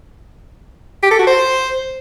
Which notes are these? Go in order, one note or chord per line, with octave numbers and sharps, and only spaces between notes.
G4
A4
F#4
C5